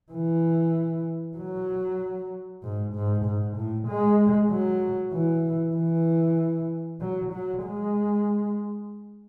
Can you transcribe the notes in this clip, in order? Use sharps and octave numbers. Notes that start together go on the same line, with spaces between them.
E3
F#3
G#2
G#2
G#2
A2
G#3
F#3
E3
E3
F#3
F#3
G#3